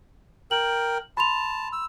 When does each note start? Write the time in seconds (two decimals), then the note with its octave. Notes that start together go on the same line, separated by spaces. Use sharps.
0.51 A#4 G5 F#7
1.17 A5 B5 C6 F7
1.73 E6